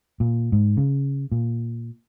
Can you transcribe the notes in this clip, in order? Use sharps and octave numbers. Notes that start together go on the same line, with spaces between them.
A#2
G#2
C#3
A#2